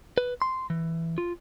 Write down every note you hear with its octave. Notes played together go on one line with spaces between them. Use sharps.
B4
C6
E3
F4